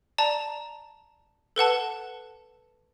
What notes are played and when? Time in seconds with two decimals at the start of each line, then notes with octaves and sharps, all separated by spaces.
0.18 D5 A5 A#5
1.56 A4 B4 F#5 A5